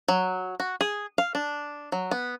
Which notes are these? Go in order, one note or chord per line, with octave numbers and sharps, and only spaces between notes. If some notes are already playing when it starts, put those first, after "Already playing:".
F#3
F#4
G#4
F5
D4
F#3
B3